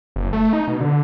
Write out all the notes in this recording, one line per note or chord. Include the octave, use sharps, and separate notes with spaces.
F#1
A3
D#4
B2
D3